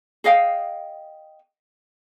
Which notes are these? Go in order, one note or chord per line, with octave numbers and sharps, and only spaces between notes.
G#4 D#5 F5 G5